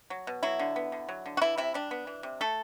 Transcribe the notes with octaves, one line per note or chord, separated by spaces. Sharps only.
F#3
B2
F#3 E4
D3
B3
D3
F#3
D3
F#4
E3 E4
C3 E4
G3 D4
B3
E3
C3
A3 A4